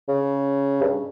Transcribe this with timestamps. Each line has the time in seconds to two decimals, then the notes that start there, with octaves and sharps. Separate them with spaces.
0.09 C#3
0.81 G2